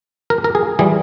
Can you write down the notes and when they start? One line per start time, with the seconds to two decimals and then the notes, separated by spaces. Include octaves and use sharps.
0.30 A#4
0.44 A#4
0.55 G#4
0.79 E3 G3 G#4